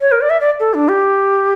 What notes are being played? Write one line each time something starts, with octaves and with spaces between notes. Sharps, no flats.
C#5
A#4
D5
E5
D5
A4
D4
G4